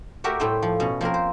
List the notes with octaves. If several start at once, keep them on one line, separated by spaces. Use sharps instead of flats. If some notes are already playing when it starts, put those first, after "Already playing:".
A3 F#4 G4 A#4 E5
A2 G3 A3 C5 G5
F3
B2 C#4
F3 A#3 C4 A#4
C5